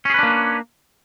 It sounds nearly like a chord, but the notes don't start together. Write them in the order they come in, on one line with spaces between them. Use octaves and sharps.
C#4 G#4 B4 D4 A#3